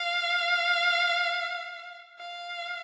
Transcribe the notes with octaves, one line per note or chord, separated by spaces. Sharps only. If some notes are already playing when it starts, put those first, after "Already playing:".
Already playing: F5
F5